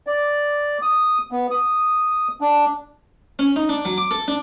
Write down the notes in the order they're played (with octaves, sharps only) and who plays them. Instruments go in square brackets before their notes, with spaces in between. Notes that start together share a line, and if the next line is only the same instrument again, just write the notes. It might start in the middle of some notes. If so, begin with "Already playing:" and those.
[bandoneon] D5
D#6
B3
D#6
D4
[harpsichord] C#4
D#4
D4
F#3
D6
A4
D4